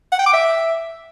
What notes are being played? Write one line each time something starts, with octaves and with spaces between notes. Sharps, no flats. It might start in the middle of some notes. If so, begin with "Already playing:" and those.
F#5
G5
D6
E5